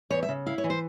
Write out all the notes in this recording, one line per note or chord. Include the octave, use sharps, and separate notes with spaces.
E2 C#5
E5
C#3
E4 F5
C#5
E3
C5